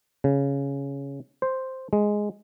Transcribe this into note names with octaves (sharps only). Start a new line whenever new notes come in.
C#3
C5
G#3